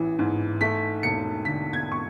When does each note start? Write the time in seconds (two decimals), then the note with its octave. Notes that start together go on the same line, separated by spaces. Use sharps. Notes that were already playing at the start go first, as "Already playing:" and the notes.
Already playing: A1 E3
0.19 G#2
0.61 A3 B6
1.03 E1 C#7
1.45 D3 B6
1.73 G#6
1.92 C#6